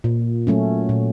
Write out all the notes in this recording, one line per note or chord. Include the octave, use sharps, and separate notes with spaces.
A#2
F#3 A3 C#4
A#2